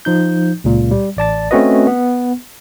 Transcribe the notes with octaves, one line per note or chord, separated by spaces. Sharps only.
F3 D#4 G6
C#2 A#2
G3
A1 D5 A5 A6
A3 C4 C#4 F#4 B4 D#5
B3